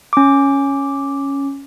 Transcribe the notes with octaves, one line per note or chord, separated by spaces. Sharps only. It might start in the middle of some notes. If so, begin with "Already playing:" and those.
C#4 D6